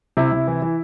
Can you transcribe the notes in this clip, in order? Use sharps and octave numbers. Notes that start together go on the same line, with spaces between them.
C3 E4
C3
E3
E3